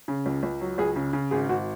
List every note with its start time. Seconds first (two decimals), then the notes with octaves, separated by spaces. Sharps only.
0.08 C#3
0.26 C#2
0.43 C#2
0.61 F#3
0.78 C#2 G#4
0.96 C#3
1.13 C#3
1.31 G#1 G#4
1.49 G#1 F#4